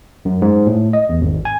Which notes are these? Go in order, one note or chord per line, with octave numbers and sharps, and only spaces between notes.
F#2
G#2
A2
D#5
E2
G#1
G#5